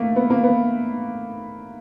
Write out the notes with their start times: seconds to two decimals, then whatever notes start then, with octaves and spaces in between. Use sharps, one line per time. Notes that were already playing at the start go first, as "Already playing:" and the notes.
Already playing: A3 A#3
0.16 B3
0.30 A#3
0.44 B3